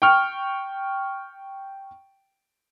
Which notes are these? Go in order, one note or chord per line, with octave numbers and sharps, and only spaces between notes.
G5 C#6 F6